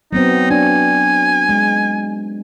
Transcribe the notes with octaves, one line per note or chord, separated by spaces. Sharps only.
F#3 B3 C4 D#4
D4 G#5
G#3